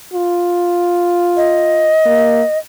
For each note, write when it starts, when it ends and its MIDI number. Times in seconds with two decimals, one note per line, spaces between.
0.14 1.94 65
1.37 2.58 75
2.06 2.42 58